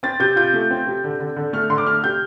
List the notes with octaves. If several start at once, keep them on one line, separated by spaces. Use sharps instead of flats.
C4 A6
C3 G6
F4 G6
A3
C4
C3
D3
D3
D3
A3 F6
D3 C6
D6
A3 F6
C3 G6